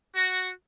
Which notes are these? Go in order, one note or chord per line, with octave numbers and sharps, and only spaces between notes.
F#4